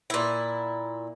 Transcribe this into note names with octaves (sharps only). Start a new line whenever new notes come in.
A#2 E4